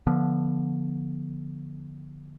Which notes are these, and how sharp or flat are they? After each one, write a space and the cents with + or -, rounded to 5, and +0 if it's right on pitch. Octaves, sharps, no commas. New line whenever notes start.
D3 +0 F3 +0 B3 -25